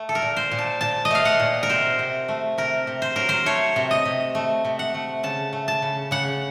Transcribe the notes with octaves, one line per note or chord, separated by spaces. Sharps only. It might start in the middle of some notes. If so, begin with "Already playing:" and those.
Already playing: A3
A4
A#4
A#2
C5
A#2
A5
A#2 A5
D#5
A3 F5
F#5
A#2
A#4
C3 C5
C3
A3
C3 A#4
C3
C5
F#3 A#4
C5
A3 C#5
C3
D#5
C3
A3
C3
F#5
A3
C#3 A5
A3
A5
C#3
C#3 F#5